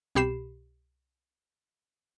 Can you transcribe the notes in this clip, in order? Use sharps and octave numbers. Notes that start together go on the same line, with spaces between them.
C2 B2 G4 B5 C7 E7